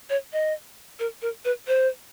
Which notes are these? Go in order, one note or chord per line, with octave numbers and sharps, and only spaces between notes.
C#5
D#5
A#4
A#4
B4
C5